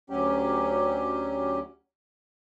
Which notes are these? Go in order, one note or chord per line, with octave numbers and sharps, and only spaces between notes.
D2 F#3 C#4 G4